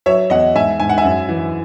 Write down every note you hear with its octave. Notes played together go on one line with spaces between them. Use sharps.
F#3 C#5 E5
E2 D#5 F#5
G#2 E5 G#5
G#2 G#5
F#5
E5 G#5
F#2
E3